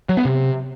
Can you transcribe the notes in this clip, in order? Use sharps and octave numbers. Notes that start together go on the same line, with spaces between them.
F#3
B3
C3